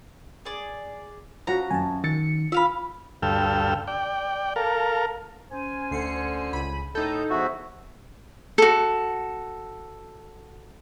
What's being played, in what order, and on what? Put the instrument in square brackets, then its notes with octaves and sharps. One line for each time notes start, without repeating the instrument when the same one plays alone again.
[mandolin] G#4 D5
[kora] F3 C#4 F#4 [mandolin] A#5
[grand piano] F#2 [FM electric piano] G#5 A5
[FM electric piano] D#3 C#7 [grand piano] A6
[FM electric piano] F4 [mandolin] E5 F5 B5
[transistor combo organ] D2 G2 A4 F5 G5 E6
D5 G5
A4 A#4 F5
[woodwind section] C#4 C5 G#5
[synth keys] D2 C7 C#7 [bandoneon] D3
[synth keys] C#2 B5
[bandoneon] A2 G6 [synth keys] D#4 A4
[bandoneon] E2 F#4 [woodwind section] C5 C#5 E5
[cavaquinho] F#4 A4